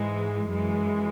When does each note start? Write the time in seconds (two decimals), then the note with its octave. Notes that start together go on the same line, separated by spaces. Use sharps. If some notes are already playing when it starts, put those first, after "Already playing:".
Already playing: G#2 E3 G#3
0.48 F#2 E3 G#3